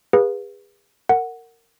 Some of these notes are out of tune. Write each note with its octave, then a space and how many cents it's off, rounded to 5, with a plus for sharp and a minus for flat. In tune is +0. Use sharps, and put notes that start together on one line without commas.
G#4 -35 B4 -20 F5 +25
A#4 -20 F#5 +0